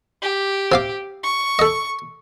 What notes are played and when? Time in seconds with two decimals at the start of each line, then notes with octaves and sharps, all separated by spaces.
0.22 G4
0.72 C3 F5 D6
1.24 C#6
1.59 A4 D#5